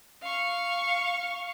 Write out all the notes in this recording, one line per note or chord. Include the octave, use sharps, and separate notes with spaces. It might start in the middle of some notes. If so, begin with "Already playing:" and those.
F5 C#6